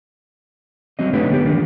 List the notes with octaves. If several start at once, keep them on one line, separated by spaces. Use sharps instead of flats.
F#3 G3 C4 D#5
D3 A3 D#4 G4 B4 C#5
B3 G4 B4
D#3 F3 A#3 D4